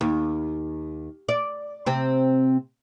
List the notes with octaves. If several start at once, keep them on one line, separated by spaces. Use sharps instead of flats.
D#2
D5
C3 C4